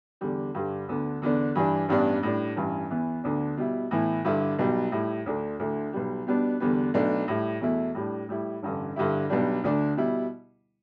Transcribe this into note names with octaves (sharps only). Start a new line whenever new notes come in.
E2 D3 G3
G2 D3 G3
D2 D3 B3
E2 D3 B3 D4
G2 E3 G3 D4
A1 G2 G3 B3 D4
A2 G3 D4
A1 G2 E3
E2 E3 B3 E4
D2 D3 B3 D4
B2 G3 E4
A2 E3 B3 E4
G2 D3 G3 E4
B1 B2 G3
A2 G3 E4
D2 D3 A3 D4
D2 D3 A3 E4
B1 B2 G3
B2 G3 B3 D4
E2 D3 G3 B3
B1 B2 A3 D4
A2 G3 E4
E2 B2 A3 E4
A2 G3 D4
A2 G3 E4
A1 G2 D3
G2 D3 G3 E4
B1 B2 G3 D4
D2 D3 A3 D4
B2 G3 E4